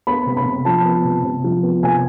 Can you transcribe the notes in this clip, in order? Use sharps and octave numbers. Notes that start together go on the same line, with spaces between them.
B3 B5
C3
B5
C3
F3 A5
B3
C3
C3
F3
B3
C3 G#5